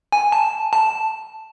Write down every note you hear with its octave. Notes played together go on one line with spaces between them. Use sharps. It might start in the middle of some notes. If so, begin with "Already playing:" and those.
G#5
A5
A5